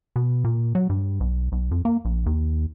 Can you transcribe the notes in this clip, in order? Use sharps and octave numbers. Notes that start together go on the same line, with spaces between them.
B2
A#2
F#3
G2
B1
B1
F2
A#3
A#1
D#2